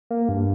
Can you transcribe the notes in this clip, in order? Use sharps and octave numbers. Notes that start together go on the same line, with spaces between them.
A#3
G2